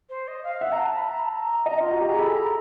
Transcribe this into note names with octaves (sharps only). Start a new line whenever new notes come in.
C5
D#5
F5
E5 F#5
A#5
A5
B5
A#5
A5
A#5
D#5 A#5
F4 A#5
F#4
G4 A#5
G#4
A4 B5
A#5